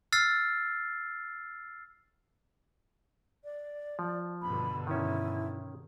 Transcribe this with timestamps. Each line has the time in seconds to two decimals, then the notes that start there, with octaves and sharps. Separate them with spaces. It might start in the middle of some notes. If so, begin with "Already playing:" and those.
0.12 E6 F6 A6 C7
3.44 D5
3.99 F3
4.42 G2 B2 D3 B5
4.87 D#3 C#4 E4